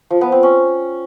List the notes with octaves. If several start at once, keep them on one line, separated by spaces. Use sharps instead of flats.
F3
B3
C4
C#4